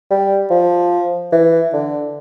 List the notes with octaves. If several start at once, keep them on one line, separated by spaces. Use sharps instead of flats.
G3
F3
E3
D3